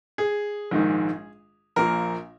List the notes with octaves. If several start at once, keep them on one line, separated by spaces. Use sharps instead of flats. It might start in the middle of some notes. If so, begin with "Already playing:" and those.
G#4
A#1 G#2 D#3 G#3
A#1 A#2 A#3 A#4